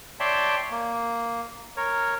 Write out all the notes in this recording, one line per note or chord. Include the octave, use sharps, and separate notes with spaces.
C#5 D5 E5 G5 A5 C6
A#3
A#4 C#5